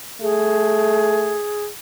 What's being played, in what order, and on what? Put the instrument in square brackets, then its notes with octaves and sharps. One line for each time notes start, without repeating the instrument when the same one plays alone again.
[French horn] A3 [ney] G#4